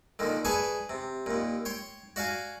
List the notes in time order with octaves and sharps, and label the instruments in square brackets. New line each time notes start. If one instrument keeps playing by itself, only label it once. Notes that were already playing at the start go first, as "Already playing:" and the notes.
[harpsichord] A#2 D3 D#3
G#4 B4 D5 G#5 A5 C#6
C3
D#2 A#2
C#5 G5 C6
F#4 D5 F5 G#5